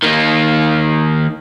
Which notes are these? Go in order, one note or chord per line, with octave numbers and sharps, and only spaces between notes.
D#3 A#3